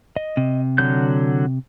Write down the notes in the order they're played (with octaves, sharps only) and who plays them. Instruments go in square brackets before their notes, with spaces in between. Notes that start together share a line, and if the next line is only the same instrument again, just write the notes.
[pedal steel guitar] D#5
[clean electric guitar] C3
[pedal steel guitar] D3 F#3 G6